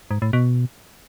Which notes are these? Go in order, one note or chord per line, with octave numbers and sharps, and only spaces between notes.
G#2
A2
B2